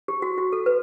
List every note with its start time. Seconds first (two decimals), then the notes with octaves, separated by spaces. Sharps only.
0.08 G4
0.22 F#4
0.38 F#4
0.52 A4
0.66 B4